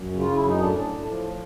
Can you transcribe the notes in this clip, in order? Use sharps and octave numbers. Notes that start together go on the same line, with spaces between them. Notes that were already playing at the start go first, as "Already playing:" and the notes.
Already playing: F#2
C#3
F4
F#2 E4
D#4
A2 D4
A2
F3